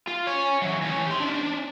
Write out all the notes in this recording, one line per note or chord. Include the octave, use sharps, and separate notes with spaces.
F4
C#5 G#5
E3 F#3
E3 C#4
G4 C6
C#4 D4